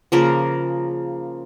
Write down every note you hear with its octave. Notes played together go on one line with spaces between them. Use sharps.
C#3 F3 A#3 A#4